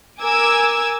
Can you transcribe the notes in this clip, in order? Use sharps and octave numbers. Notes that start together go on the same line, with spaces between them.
A#4 G#5 D6 E6 G#6